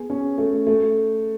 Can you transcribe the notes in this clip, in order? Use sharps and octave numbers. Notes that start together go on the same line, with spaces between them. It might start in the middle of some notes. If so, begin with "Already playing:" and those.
Already playing: B3 G#4
C#4
A3
A3